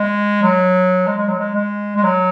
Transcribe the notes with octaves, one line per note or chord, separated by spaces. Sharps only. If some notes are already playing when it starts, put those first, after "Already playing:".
Already playing: G#3
F#3
G#3
G#3
F#3
G#3
G#3
G#3
F#3